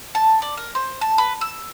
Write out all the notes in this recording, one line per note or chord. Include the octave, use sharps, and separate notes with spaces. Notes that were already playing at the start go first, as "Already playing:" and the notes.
A5
D5
A#4
C5
A5
B4
E6